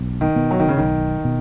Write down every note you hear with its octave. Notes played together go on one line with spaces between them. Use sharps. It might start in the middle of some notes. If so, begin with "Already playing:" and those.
Already playing: B1
D#3
B2 B3
F#3
D#3
C#3
B1 D#3
B2